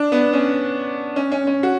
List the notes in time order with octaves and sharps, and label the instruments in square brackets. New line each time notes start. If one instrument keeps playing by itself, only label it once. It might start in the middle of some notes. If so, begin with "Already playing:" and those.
Already playing: [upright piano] D4
B3
C#4
C#4
C#4
C#4
F#4